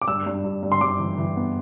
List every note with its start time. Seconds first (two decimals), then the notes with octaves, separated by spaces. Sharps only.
0.02 D6
0.08 G2 E6
0.26 G2
0.44 G2
0.63 G2
0.72 C6
0.81 G2 D6
0.99 E3
1.18 E3
1.36 B3